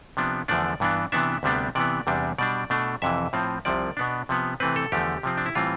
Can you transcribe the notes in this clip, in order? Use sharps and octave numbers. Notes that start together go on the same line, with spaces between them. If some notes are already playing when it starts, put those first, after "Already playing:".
C3 F3 B3 D4
E2 D3 F3 A3 D4 D5
G2 E3 B3 D4
C3 E3 B3 D4 E5
D2 C3 G3 B3 D4
C3 E3 B3 D5
E2 C3 G3 D4
B2 G3 D4 D5
B2 A3 D4
F2 C3 E3 E5
A2 F3 C4
C2 C3 F3 D5
B2 B3 D4
C3 F3 B3
C3 E3 A3 C4 B4
A4
E2 D3 F3 A3 G4
C3 F3 C4
D4
E4
A2 E3 G3 C4 F4